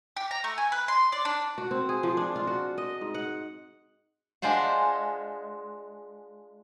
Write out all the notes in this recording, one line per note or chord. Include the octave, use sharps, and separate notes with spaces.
G4
A#5
A3
G#5
B4
C6
D5
D4
F#4
C4
G#4
F3
D4
F4
F#4
D#5
G#2
F#5
G#3 D4 F4 C5 F#5